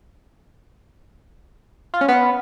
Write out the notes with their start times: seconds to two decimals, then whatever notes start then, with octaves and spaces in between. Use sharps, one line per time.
1.94 F4
2.01 C#4
2.08 B3